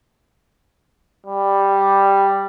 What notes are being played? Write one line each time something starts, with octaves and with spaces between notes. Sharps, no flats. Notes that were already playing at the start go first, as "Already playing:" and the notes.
G3